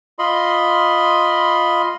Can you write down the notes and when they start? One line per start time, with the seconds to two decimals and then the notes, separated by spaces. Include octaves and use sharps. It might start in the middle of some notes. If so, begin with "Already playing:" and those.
0.19 F4 D#5 B5 C6